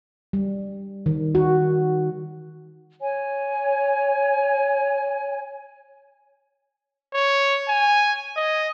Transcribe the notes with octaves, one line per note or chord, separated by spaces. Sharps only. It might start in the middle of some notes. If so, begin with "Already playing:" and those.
G3
D#3
F#4
C#5 G#5
C#5
G#5
D#5